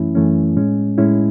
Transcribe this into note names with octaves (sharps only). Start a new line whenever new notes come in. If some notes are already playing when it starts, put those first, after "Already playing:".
Already playing: F#2 E3 A3 C#4 E4
F#2 E3 A3 C#4
A2 G#3 C#4
A2 G#3 C#4 E4